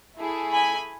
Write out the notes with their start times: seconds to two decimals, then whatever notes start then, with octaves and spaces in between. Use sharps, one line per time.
0.17 A3 E4 G#4
0.52 G#5 B5